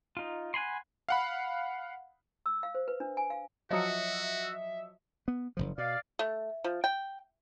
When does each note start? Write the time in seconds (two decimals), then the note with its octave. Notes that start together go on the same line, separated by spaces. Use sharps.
0.17 D#4 F4
0.54 F#5 G#5 B5 C6
1.09 F5 F#5 B5
2.46 E6
2.63 F5
2.75 C5
2.88 B4
3.00 D4
3.17 G#5
3.30 F5
3.70 F3 F#3 F#4 D#5 E5 D#6 C#7
5.28 B3
5.57 F#1 B1 F3
5.78 B2 D5 F5
6.19 A3
6.64 F3
6.84 G5